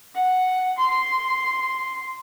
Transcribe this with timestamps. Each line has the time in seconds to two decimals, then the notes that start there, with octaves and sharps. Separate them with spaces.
0.14 F#5
0.78 C6